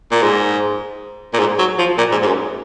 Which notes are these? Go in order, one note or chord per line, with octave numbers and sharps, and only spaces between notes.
A#2
G#2
A#2
G#2
F#3
F3
A#2
G#2
G#2
F#2